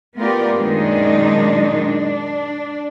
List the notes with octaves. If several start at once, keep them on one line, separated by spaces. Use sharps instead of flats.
A3 B3 F4 G4 A#4 D5
F#2 A#2 D#3 G#3 D4 D#4
D4